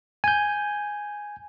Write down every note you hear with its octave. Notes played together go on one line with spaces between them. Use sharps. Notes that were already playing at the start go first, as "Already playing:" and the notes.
G#5 G6